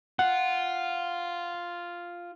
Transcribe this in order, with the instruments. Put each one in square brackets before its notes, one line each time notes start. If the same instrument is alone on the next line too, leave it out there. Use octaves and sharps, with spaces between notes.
[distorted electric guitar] F4 [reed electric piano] F#5